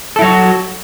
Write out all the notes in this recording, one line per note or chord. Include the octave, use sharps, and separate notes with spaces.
F#3 E4 F#4 A4